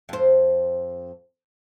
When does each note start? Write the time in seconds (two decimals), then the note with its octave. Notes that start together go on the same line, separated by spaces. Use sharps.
0.09 F2 C5